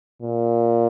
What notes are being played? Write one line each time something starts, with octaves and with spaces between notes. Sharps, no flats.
A#2